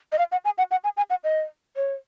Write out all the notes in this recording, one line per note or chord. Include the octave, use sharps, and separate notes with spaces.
D#5
F5
F#5
G#5
F#5
F#5
G#5
G#5
F#5
D#5
C#5